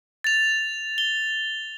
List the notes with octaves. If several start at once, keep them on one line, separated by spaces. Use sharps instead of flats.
A6 F7
G7